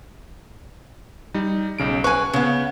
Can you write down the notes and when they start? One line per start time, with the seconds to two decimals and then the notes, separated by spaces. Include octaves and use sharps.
1.34 G3 D#4
1.79 B1 C#3 D7
2.04 B4 G#5 C#6
2.33 C#3 B3